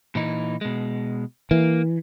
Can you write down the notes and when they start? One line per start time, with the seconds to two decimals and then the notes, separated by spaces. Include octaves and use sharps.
0.15 A#2 E3 D#4
0.61 B2 G#3
1.51 E3 A#3